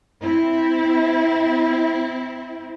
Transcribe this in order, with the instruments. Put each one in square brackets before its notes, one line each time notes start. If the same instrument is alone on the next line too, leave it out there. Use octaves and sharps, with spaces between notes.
[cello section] C4 E4